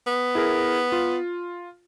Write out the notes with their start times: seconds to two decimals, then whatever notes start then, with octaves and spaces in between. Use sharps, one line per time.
0.07 B3
0.35 E4 G#4 A#4
0.92 F4